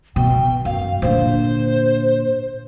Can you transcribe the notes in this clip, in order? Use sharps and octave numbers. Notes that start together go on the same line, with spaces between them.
B2 G5
F#2 F5
A#2 D3 C5